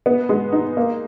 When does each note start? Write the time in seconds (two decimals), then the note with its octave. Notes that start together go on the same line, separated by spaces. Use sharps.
0.06 B3
0.29 G#3
0.52 D#4
0.77 A#3